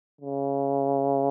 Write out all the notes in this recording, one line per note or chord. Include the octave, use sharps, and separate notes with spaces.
C#3